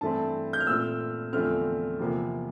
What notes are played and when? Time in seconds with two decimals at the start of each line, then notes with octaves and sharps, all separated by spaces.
0.01 G2 E3 A3 C4 A5
0.53 G6
0.60 F6
0.67 A#2 A3 C4 E6
1.33 E2 D3 F3 A3 C4 F6
1.99 E2 C3 F3 A#3